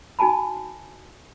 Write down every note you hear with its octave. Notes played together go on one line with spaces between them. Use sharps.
D#4 F#4 G#5 A5 B5